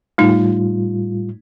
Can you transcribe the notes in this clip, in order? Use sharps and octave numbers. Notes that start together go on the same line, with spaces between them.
A2 G3 A3 D#4 F4